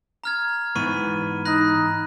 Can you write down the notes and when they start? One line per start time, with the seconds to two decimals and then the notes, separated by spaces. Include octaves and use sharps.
0.24 A#5 F6 G#6
0.75 G#2 E3 B3 B5 C#6 D#7
1.45 D#4 B5 F#6 A#6